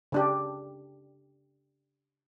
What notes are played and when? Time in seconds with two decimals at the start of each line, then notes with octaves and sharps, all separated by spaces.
0.12 C#3 D4 G4